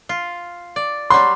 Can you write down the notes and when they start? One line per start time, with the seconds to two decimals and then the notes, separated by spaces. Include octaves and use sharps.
0.09 F4
0.76 D5
1.10 F#3 G3 C6